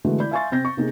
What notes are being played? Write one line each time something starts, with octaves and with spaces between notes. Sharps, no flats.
D3 E3 G#3 A3 F#4
E4 D5 B5 G6
E5 F5 G#5 C6 C#6 A6
C3 C4 G6 A#6
C#6
C3 A#3 D#4 G#4